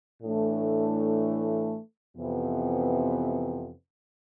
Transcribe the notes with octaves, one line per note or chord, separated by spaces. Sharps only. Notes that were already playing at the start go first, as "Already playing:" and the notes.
A2 E3 A3 D4
F2 C3 E3 B3